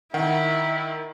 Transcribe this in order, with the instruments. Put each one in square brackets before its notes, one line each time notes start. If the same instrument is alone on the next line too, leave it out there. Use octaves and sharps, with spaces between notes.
[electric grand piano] D#3 [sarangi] E4 [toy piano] F#5